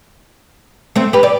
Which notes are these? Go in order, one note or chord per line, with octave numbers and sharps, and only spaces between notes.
A3 C4
G4 B4
D5